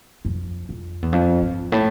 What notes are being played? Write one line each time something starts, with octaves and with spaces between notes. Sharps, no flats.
F2
F2
E2
F2
G2
A2